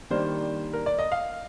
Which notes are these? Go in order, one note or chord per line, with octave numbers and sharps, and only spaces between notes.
D#3 G3 A#3 D4 C5
A#4
D5
D#5
F5